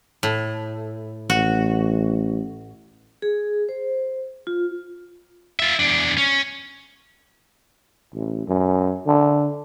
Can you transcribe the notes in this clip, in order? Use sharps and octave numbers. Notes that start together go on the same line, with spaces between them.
A2
A1 F#4
G#4
C5
F4
F4 E5
E2 D4
C#4
A1
F#2
D3